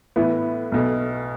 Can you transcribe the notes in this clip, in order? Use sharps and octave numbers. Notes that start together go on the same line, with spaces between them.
A2 E3 B3 E4
B1 B2 A3